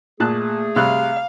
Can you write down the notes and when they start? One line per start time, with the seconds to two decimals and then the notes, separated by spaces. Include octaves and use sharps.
0.20 A#2 A3 G#4 A5 F#6
0.76 C3 G3 F5 F#6